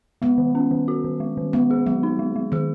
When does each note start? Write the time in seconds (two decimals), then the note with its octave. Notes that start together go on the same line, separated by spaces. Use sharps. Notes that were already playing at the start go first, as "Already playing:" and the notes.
0.22 G#3 B3
0.38 D#3
0.55 C#4
0.71 D#3
0.88 F#4
1.04 D#3
1.20 G#3
1.37 D#3
1.53 G#3 B3
1.71 G#4
1.86 F#3 G#3
2.03 D#4
2.19 G#3
2.36 G#3
2.52 D#3 G#4